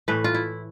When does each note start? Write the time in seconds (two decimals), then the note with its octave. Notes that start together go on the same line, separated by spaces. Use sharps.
0.08 A2 E3 A3 B4
0.24 F4
0.34 E4